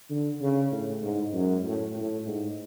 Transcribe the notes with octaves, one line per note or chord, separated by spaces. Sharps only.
D3
C#3
A2
G#2
F#2
A2
A2
G#2